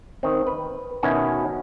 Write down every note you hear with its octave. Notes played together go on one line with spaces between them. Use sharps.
D#3 C4
B4
B2 D#3 C#4 E4 F#4